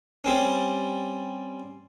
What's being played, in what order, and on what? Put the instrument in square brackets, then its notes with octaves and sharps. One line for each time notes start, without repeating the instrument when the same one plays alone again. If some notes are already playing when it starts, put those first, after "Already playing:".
[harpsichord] G3 C4 C#4